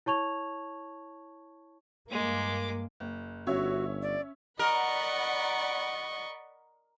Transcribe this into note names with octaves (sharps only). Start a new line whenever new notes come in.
E4 C#5 A5 C#6 G#6 F7
G2 G#3 A#3 D6
F#1
G1 C#4 F#4 C#5 E5
D5
A#4 D5 D#5 F#5 B5 C#6